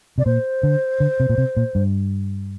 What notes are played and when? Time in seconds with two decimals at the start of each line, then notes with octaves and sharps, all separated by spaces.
0.18 C3 D5
0.26 A#2 C5
0.63 D3
1.00 D3
1.20 C3
1.29 A#2
1.38 C3
1.57 A#2
1.75 G2